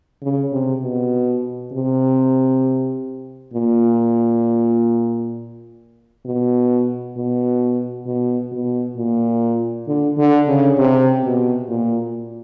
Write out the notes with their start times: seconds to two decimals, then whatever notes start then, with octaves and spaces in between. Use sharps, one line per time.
0.23 C#3
0.52 C3
0.82 B2
1.72 C3
3.54 A#2
6.26 B2
7.16 B2
8.06 B2
8.52 B2
8.97 A#2
9.88 D3
10.18 D3
10.48 C#3
10.78 C3
11.24 B2
11.69 A#2